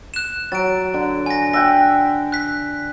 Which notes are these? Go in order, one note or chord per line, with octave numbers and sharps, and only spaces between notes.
F#6 E7
F#3 A6 D7
D3
G#5 A#6
E5 F#5 G5 A#6
F#6 B6